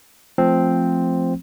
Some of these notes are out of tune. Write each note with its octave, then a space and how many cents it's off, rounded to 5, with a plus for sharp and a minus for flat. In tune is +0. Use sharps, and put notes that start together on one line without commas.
F3 +0 A3 +0 C4 +0